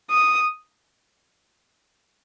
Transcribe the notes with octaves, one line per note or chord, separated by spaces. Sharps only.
D#6